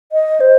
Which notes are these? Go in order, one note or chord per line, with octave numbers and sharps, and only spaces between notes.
D#5
C5